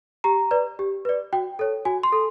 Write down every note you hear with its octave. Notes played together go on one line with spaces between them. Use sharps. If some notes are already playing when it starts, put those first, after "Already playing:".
G4 A#5
B4 D5
G4
B4 D5
F#4 G5
A4 C#5
F#4 G#5
C6
A4